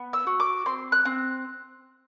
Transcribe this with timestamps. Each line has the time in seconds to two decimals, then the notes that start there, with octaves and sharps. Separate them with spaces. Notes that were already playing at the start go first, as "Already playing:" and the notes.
Already playing: B3
0.13 E6
0.27 F#4
0.40 D6
0.66 C4 C6
0.92 F#6
1.05 C4